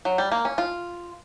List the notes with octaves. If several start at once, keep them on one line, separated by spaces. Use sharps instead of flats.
F#3
G3
A#3
C#4
F4